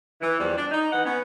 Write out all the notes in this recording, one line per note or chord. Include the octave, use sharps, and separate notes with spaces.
E3
E2 F3 G3
D4
D#4
E3 B3 F#5
B3 C#4